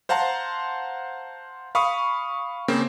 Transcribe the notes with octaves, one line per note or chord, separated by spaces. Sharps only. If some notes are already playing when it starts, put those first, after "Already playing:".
C5 F5 F#5 A5 A#5 C6
F5 B5 C#6 D#6
C#3 A#3 C4